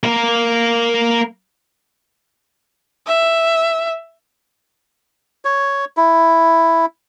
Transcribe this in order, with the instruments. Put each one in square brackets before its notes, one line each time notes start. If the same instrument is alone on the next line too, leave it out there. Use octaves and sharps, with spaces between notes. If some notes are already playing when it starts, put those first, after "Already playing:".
[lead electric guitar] A#3 A#4
[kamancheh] E5
[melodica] C#5
E4